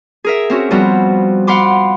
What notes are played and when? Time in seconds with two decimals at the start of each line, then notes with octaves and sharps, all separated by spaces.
0.24 G#4 A#4 E5
0.50 C4 C#4 F#4
0.71 F3 G3 B3 C4 F#4
1.47 F5 F#5 B5 C6 D6